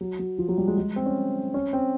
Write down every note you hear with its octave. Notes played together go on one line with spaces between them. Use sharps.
F#3
F#3
F3
F#3
G3
G#3
G#3
C4
C#4
C#4
C4